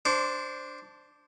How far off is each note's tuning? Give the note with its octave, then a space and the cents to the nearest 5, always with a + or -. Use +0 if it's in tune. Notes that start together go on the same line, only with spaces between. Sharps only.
D4 +0 C5 +0 D6 -40